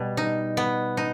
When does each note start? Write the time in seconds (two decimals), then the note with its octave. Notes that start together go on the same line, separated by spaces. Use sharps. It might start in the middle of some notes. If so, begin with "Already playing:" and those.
Already playing: B2 G3
0.17 D#4
0.57 B3
0.97 D#4